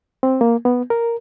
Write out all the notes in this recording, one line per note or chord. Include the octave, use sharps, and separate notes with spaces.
C4
A#3
B3
A#4